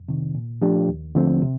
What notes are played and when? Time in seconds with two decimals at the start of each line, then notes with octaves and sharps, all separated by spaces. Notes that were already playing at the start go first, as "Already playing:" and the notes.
Already playing: F2
0.09 C3 D#3
0.35 A#2
0.62 F3 A3 D4 G4
0.89 D#2
1.15 D3 F3 A3 C4
1.42 C3